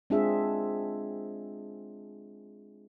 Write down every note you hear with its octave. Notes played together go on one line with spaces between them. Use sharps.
G#3 C4 D4 F4 G#4 E5